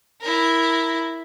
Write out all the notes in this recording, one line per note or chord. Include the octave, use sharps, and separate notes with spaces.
E4 A#4